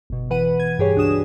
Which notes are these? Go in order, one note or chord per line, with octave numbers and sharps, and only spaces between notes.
G1 B2
E3 B4 F#5 D#7
G#6
G2 G4 G#4 C#5
C#2 D4 F#4 D#6 E7